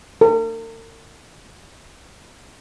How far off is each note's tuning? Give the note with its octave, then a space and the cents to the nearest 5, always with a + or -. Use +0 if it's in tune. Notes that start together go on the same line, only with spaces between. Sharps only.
A#4 -45